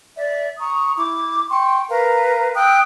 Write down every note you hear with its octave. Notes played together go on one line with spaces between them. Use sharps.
D5 E5
A#5 C#6 D#6
E4 D6
G5 C6 C#6
A#4 B4 F5 A#5
G5 D#6 E6 F#6